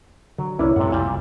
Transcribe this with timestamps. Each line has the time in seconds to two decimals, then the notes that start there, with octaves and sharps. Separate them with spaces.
0.38 D3 F#3
0.59 C2 A#3 D4 E4 B4 C#5
0.76 F#2 A2 C3 G#3 A4 F#5
0.92 F#1 C2 F2 A#2 G3